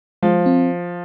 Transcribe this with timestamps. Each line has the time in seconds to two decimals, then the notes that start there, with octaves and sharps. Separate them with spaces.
0.23 F3 G#3
0.46 C4